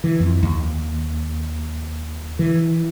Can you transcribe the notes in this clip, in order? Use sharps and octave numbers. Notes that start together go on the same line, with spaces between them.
E3
F2
D#2
E3